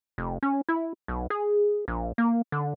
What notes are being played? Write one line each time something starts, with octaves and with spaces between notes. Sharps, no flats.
F1
C#4
E4
B1
G#4
A#1
A#3
D3